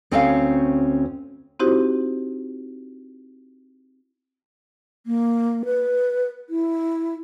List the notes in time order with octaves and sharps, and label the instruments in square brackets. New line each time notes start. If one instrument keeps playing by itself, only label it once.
[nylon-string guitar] D2 C4 C#4 C#5 E5 F5
[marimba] C4 D#4 E4 F#4 G4 C5
[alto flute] A#3
B4
E4